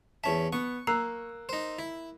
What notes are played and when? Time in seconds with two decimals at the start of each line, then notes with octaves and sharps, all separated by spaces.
0.24 E2 C#4 E5 A5
0.52 B3 C#6
0.87 A#3 A#5 E6 F#6 C7
1.49 D#4 C5
1.79 E4